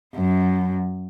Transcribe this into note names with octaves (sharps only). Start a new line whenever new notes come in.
F#2